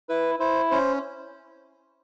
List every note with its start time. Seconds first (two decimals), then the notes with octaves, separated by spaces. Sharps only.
0.09 E4 B4
0.40 E4 C5
0.71 C#4 C5